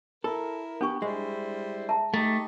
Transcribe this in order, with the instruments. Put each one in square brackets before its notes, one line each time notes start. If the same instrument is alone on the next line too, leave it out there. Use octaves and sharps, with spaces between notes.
[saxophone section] E4 A#4 [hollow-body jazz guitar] A4
[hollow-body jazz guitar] B3 G4 [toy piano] D4 C#6
[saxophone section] G3 E4 C5 [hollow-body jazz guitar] G#3
[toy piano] E5 A5 A#5
[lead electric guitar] A3 [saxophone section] D#4 G4 [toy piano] A#5